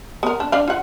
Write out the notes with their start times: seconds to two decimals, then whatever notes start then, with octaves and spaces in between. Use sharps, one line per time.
0.23 B3 A#4
0.40 D4
0.52 D4 F5
0.68 F4 F#5